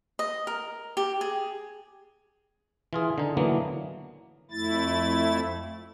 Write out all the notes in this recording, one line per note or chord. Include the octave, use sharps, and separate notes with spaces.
D#5
A#4
G4
G#4
E3 F4 G#4
D3 D#4
D3 E3 F#3 A#3 B3
F2 A3 E4 A6